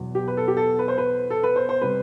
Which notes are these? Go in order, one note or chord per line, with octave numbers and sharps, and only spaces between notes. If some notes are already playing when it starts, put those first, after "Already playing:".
Already playing: E2 B2 F#3
G4
B4
A4
G4
A4
B4
C5
B4
A4
B4
C5
C5
C3 G3 B4